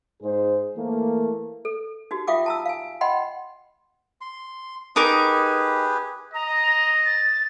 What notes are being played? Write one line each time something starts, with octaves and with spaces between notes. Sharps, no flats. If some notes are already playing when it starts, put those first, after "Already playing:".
G#2 G#4 C5
E3 A3 A#3
A4
D#4 F#4 G4
F4 E5 F5 G5 D6 D#6
A5 A#5 E6
F5 G#5
D#5 F#5 G5 B5 C6
C6
D#4 G4 G#4 A#4 B4 D6
D#5 A#5
A6